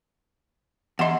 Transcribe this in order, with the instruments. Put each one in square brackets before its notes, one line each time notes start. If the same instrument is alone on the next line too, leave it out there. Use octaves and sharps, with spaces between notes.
[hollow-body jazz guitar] E2 C6 [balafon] D#5 F#5